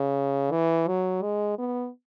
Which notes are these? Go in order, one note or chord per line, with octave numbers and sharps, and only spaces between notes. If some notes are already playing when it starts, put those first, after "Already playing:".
Already playing: C#3
E3
F#3
G#3
B3